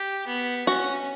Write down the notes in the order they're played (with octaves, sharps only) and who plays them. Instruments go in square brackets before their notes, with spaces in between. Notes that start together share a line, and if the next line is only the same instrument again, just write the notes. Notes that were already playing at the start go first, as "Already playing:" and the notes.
Already playing: [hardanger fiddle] G4
B3
[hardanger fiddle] C#4 [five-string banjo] F#4